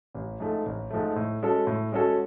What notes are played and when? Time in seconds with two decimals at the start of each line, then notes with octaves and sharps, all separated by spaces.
0.14 A1
0.40 G#2 F3 A3
0.66 A1
0.91 G#2 F3 A3
1.16 A2
1.43 G#3 C#4 F#4 A4
1.67 A2
1.92 G#3 C#4 F#4 A4